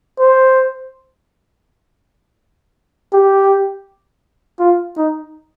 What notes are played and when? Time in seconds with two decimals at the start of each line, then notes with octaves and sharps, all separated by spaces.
0.20 C5
3.13 G4
4.60 F4
4.97 D#4